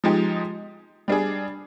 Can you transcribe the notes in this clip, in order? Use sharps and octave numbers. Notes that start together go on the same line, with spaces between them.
F3 G#3 D#4 G4
G3 D4 G#4